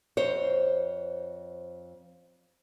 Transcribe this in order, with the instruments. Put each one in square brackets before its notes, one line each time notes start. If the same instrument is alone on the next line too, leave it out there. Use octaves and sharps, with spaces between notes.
[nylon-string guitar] F2 C5 C#5